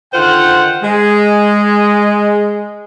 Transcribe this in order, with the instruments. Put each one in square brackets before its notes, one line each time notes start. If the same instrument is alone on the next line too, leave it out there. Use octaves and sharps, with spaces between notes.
[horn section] D3 D#3 F4 C5 F#5 G5
G#3